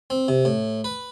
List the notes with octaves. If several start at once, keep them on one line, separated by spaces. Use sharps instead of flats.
C4
C3
A2
B4